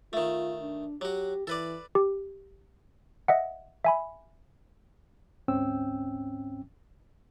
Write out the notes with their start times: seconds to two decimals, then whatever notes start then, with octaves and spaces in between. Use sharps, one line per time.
0.13 D#3 A3 F4
0.62 D4
1.01 F#3 F#4 G4
1.47 E3 A4 B4 D5
1.95 G4
3.28 D#5 E5 F#5
3.85 E5 G#5 B5
5.48 D2 G#2 C4 C#4 G5 E6